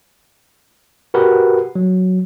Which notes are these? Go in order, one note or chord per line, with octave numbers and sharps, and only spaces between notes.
F#4 G4 A#4 B4 F#5
F#3